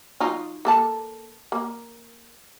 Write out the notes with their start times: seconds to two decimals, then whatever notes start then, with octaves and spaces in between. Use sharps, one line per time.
0.20 F#3 D#4 F4
0.65 A#3 A4 A5
1.52 A#3